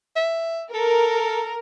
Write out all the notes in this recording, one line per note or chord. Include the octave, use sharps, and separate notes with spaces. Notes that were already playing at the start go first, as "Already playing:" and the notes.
E5
A4 A#4